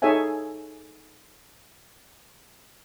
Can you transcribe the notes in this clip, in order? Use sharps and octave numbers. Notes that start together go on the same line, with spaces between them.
D#4 G#4 A4 C#5 E5 G#5